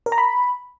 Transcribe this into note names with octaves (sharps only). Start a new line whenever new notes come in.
A#4
A#5
B5